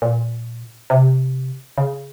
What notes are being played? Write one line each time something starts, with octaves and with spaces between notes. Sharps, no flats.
A#2
C3
C#3